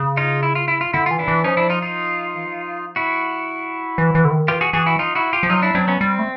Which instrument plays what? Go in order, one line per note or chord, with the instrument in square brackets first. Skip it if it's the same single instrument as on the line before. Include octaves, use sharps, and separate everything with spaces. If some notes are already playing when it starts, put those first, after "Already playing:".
Already playing: [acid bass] C#3
[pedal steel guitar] D#4 F4
E4
F4
E4
F4
[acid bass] D3 [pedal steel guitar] E4
[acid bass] E3 [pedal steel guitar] F4
[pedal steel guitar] D4 E4
[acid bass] E3
[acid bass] F3 [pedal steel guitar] C#4 D#4
[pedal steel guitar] D4 E4
D#4 F4
D#4 F4
[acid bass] E3
F3
[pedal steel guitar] E4 F#4
[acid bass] E3
E3
D3
D#3
[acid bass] E3 [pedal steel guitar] F4 G4
[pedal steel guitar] F#4 G#4
[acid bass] E3 [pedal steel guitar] F#4 G#4
[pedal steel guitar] E4 F#4
D#4 F4
E4 F#4
F4 G4
[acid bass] F3
[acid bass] F#3 [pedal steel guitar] D#4 F4
[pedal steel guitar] D4 E4
[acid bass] F#3 [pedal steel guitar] C4 D4
[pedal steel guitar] B3 C#4
[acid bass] G3 [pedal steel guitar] C4
[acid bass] A3